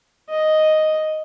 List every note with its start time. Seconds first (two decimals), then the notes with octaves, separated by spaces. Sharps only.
0.29 D#5